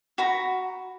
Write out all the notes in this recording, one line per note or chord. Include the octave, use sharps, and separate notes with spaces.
F#4 A#5 B5